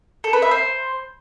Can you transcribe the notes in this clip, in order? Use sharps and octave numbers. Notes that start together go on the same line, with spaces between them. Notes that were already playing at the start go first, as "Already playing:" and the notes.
A4
B4
E5
C5